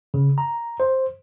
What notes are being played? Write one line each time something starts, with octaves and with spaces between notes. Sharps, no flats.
C#3
A#5
C5